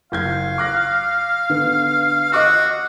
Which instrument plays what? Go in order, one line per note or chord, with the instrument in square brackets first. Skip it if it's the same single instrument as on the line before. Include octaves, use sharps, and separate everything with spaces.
[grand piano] F#1 G6 G#6 [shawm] F5
[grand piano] D6 F#6 A#6
D3 B3
[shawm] F#4 [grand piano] D#5 D6 E6